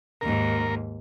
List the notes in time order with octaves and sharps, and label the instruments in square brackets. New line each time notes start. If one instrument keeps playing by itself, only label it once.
[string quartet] D#2 G#2 [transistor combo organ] A#4